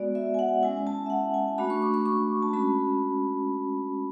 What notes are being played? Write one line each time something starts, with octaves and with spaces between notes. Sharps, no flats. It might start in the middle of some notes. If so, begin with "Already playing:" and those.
Already playing: G#3 B3 F#4 D5
E5
G#5
F#5
G#3 C#4 E4 G#5
A5
E5
F#5
G#5
A3 D4 F#4 B5
C#6
D6
C#6
C#6
A5
G#3 C#4 F#4 B5